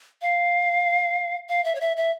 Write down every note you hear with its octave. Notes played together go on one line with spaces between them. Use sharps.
F5
F5
E5
C#5
E5
E5